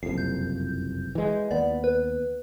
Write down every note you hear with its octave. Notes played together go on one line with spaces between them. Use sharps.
F#1 C2 F2 C7
G6
E3 G#3
D#2 B3 D5
B4